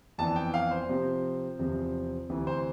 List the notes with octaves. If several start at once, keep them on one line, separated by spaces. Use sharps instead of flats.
F2 E3 B3 D4 A5
G5
F5
C5
C3 F3 C4
E2 C3 F3 C4
D2 C3 E3
C5